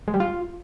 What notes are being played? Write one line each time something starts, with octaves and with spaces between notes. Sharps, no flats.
G#3
G3
F4